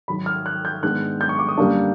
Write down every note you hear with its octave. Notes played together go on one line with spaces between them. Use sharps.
G#2 D#3 F#3 B5
F6
F#6
G6
G#2 D#3 G#3 B3 D4 F#6
G6
C#6
D6
D#6
F#2 D3 G3 A#3 D4